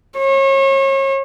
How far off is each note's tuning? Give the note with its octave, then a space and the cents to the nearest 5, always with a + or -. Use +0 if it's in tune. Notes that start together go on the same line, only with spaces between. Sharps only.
C#5 -35